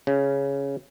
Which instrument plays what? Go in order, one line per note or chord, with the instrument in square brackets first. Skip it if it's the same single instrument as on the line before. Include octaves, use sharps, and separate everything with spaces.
[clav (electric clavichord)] C#3